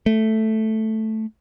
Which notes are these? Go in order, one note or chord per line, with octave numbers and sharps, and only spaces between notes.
A3